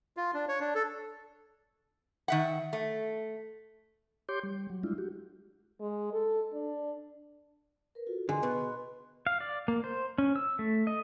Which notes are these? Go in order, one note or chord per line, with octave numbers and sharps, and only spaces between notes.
F4
D4
C#5
D4
A4
D#3 E5 F#5
A3
G4 C#5 C6 D6 G6
G3
F#3
G3 G#3 D4 E4 F4
F#4 G4
G#3
A4
D4
A#4 B4
F4 F#4 A4
D3 G#4 D#5 C6
B2 B4
F5
D5
A#3
C5
C#4
E6
A3
D#5